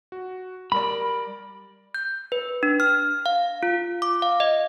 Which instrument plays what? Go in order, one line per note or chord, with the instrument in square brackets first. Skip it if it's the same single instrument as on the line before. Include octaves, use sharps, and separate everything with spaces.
[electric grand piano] F#4
[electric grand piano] G3 A#4 D5 [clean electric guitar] B5
[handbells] G6
B4
D4
F6
F5
F4
D6
F5
D#5